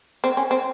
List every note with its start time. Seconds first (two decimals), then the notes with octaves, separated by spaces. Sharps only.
0.24 C4
0.37 C#4
0.51 C4